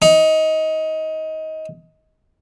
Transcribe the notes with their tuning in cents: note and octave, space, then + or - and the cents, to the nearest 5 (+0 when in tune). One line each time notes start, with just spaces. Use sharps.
D#4 +20